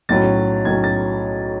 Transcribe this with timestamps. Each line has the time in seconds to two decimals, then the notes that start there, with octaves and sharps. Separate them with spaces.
0.09 B1 A2 F#3 C#4 A6
0.65 B1 A2 F#3 C#4 G#6
0.84 A6